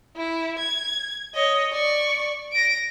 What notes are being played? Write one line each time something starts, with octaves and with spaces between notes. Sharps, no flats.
E4
G#6
C#5 D#5
D5 C#6
A#6 D7